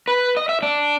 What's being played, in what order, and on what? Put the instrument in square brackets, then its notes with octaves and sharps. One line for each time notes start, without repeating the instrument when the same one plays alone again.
[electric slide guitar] B4
D#5
E5
D4